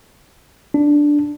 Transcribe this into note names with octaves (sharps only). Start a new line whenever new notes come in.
D4